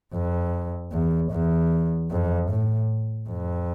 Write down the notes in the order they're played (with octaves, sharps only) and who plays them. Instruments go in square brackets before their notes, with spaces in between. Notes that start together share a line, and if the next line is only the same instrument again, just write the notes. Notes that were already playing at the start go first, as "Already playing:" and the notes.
[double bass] F2
E2
E2
F2
A2
F2